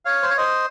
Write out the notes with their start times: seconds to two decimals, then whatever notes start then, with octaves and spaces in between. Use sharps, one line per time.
0.05 C#5 F5
0.23 C5
0.30 C#5
0.37 C5 D#5